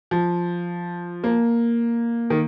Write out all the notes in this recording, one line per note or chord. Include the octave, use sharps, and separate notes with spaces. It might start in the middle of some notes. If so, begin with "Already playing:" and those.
F3
A#3
D#3